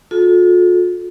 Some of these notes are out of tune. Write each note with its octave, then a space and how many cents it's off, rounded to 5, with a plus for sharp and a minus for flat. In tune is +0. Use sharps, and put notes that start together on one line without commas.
F4 +45 A4 -25